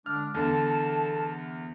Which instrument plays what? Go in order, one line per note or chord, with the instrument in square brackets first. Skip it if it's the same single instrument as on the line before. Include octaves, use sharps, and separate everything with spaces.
[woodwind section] D3 G#3 D4 [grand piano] F6
[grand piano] E2 D3 [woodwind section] A4 A5